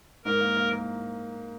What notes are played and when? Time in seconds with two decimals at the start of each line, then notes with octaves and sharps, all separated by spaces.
0.24 G#2 A#4
0.40 A#3
0.57 A#3
0.73 A#3